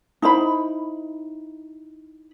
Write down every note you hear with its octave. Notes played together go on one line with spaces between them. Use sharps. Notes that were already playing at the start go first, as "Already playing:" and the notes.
D#4 E4 C5 B5